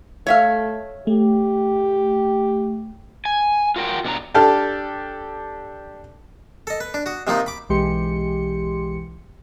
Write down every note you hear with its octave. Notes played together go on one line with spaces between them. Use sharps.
A3 C#5 E5 F5
A3 G4
G#5
F4 F#4 A#4 E5 G5
B2 D4 A#4 A#5
D4 G4 A4 F6
A4 D#5
B4
D4
F#4 D#6
C3 D#3 F3 A#3 D#4 F4
B5 D6
B1 E3 G#3 G4 C6 C#7